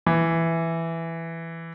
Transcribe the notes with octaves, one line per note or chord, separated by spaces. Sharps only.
E3